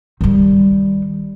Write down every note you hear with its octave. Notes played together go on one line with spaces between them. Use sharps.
D#3 G3